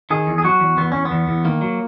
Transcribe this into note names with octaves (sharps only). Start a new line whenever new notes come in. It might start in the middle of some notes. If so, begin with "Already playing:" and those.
D#3 G#4
E2
G#4
F#3 F#4
E2
E2 B3
E2 C#4
B3
E2
E2
D#3 A#3
F#3